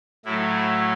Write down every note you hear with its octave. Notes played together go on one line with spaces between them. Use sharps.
A2 F#3 A3 E4
E4